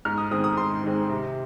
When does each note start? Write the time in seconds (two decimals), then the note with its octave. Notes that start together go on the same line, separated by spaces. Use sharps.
0.05 G#2 F6
0.18 D#6
0.31 D#3 G#3 C4 D#6
0.44 D#6
0.57 G#2 C6
0.84 D#3 G#3 C4
1.10 C3